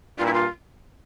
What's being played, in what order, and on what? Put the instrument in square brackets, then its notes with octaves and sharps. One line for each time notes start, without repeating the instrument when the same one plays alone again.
[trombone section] G2 A#2 [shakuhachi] F4
[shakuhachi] E4
F4